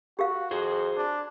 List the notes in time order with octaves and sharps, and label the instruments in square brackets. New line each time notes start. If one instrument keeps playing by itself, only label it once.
[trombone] F#4 [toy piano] G4 A#4 F5
[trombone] F2 [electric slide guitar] F#4 G#4 C5
[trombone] D4